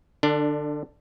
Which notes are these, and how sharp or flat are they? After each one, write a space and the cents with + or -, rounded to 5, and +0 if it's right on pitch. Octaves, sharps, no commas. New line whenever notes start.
D3 +25 D4 +0